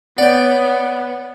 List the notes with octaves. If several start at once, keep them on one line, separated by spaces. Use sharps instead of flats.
B3 C#5 D5 F#5 G5